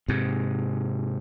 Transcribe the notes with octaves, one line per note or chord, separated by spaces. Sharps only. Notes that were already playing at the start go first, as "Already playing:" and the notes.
G#2 C3